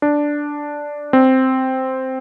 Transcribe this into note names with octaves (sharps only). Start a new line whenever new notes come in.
D4
C4